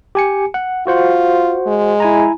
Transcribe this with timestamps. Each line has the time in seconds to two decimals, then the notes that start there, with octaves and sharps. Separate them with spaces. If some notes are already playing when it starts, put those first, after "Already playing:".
0.15 G4 G#5 C#7
0.54 F#5
0.87 F4 F#4 C5 F#5
1.67 G#3
2.00 E4 G#5 A#5